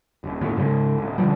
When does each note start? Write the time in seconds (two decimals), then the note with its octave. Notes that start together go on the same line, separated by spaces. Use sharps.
0.24 D#1
0.41 A1 D#2 A2
0.57 G#2 C#3 F#3 G#3
0.98 D1
1.18 B2 D3 F3 G3